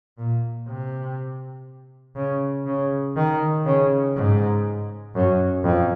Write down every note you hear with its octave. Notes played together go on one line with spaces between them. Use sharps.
A#2
C3
C#3
C#3
D#3
C#3
G#2
F#2
F2